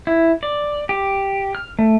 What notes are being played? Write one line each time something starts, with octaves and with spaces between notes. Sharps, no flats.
E4
D5
G4
F6
A3